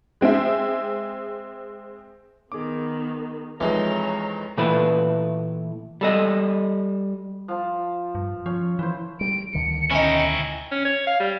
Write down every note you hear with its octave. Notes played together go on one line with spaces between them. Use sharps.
G#3 C4 G#4 E5
D#3 B3 G#4 D6
F2 E3 G#3 D#4 C#5 A#5
A#2 E3 A3 E4 B4
G3 A4 D#5
F3 A5
G2
F3 C#4
E3 E4 C5
G3 D7
D2 D3 D#3 C#7
C#4 D#4 E4 G5
C#4
C#5
F5
G3